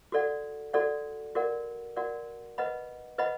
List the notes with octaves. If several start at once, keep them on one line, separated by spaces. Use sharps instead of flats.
F#4 A4 D5 F#5
F#4 A4 D5 F#5
F#4 A#4 D5 F#5
F#4 A#4 D5 F#5
B4 D#5 F#5 B5
B4 D#5 F#5 B5